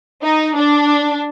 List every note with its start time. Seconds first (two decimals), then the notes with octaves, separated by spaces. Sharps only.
0.22 D#4
0.56 D4